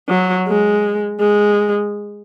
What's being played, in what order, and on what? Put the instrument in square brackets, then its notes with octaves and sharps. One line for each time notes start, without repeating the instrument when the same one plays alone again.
[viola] F#3
G#3
G#3